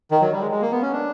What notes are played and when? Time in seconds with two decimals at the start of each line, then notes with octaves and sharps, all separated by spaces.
0.11 D#3
0.21 F#3
0.32 G3
0.41 G#3
0.51 G#3
0.61 A#3
0.71 B3
0.82 C#4
0.92 D4